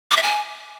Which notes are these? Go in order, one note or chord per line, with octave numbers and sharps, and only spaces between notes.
D6
E5
G#5